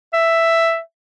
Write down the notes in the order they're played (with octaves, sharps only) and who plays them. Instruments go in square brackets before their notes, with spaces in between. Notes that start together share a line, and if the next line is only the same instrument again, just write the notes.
[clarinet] E5